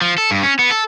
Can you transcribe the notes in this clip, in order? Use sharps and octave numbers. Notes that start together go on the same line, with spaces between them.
F3
A4
G2
C#4
B3
A4